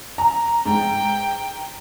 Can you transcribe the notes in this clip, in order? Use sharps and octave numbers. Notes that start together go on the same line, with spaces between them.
A#5
G#2 G5